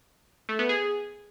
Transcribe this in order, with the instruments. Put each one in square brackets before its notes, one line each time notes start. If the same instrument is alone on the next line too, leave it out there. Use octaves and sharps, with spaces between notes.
[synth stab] A3
B3
G#4